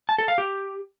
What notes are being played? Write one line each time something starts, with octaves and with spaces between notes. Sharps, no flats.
A5
A4
F5
G4